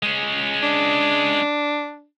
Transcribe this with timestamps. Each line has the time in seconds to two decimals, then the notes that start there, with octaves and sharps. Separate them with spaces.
0.03 G#3 C#4
0.63 D4